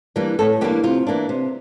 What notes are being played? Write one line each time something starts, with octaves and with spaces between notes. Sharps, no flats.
E3 G3 A#3 D4
A2 A4
E3 G3 A#3 D4 G4
C3 F4
E3 A#3 D4
C3